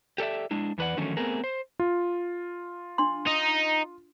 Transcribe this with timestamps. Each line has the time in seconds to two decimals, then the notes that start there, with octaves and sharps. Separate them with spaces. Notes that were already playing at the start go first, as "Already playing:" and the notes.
0.18 G4 A4 D5 E5
0.51 G#3 D4 E4
0.78 E2 E3 B4 D5 F#5
0.97 D3 D#3 F3 F#3 A3 C#4
1.17 A3 B3 C4 G#4 A#4
1.44 C5
1.80 F4
2.98 D4 C6
3.27 D#4